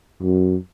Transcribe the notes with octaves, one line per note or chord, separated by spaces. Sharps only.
F#2